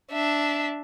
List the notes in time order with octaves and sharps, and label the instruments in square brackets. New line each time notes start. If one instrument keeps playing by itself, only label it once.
[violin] D4 E5